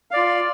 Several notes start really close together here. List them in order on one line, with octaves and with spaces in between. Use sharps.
F5 D5 F4